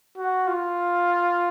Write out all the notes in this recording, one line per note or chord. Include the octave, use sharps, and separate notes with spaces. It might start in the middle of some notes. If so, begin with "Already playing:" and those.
F#4
F4